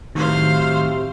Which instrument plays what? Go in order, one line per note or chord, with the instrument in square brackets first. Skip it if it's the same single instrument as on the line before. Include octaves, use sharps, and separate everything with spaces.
[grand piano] A2 F#3 [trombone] C3 [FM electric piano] D#3 [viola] C5 F5